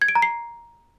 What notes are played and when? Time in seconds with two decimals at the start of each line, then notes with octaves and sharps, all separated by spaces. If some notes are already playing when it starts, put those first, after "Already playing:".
0.02 G#6
0.08 D7
0.15 A#5
0.22 C7